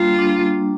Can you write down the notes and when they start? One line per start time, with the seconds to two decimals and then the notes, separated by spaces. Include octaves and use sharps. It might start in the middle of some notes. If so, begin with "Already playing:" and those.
Already playing: G3 A#3 D4 F4
0.16 A#3 D4